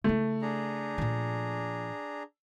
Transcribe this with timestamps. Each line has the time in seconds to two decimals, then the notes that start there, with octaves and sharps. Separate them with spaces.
0.04 C#3 A3 E4
0.42 D4 G#4 A#5
0.98 A#2 F3